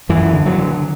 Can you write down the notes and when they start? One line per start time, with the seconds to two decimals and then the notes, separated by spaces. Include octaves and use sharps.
0.09 F#2 E3
0.33 D3
0.46 F#3
0.58 D3